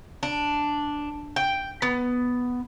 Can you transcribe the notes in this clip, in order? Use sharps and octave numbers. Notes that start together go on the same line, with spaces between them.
D4
G5
B3